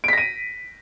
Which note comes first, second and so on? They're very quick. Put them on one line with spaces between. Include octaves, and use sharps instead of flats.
D7 B6 A#6 D#7